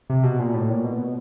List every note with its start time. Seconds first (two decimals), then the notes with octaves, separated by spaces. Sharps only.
0.10 C3
0.23 B2
0.39 A#2
0.54 A2
0.69 A#2
0.84 B2
0.98 B2